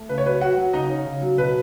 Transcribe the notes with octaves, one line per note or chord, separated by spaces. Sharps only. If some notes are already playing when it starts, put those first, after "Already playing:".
Already playing: A3
C#3 B4
C#5
F#3 B4
F#3 F#4 F#5
F#3
C#3 D#4 D#5
C#4
C#3
F#3
B2 B4